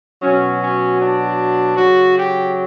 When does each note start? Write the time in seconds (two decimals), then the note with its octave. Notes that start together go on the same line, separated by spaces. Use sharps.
0.22 B2 F#3 C#4
0.61 C#4
0.99 D4
1.76 C#3 F#3 F#4
2.15 G4